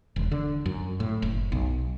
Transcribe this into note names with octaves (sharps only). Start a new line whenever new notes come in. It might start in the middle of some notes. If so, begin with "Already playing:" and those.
E1
D3
F#2
A2
F#1
B1